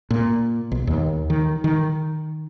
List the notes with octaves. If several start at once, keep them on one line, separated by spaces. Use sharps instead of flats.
A#2
B1
D#2
D#3
D#3